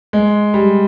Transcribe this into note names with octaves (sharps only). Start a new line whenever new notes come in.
G#3
G3